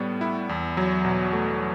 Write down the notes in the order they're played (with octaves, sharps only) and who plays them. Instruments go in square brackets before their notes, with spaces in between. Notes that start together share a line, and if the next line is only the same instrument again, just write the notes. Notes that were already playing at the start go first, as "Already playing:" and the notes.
Already playing: [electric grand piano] A2 G3 B3
E4
E2
F#3
B2
A3